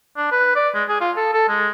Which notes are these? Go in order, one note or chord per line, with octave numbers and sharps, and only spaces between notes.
D4
B4
D5
G#3
G#4
F4
A4
A4
G#3